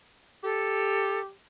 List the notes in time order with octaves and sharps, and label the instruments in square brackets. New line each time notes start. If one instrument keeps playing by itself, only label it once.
[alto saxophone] G4 [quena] A4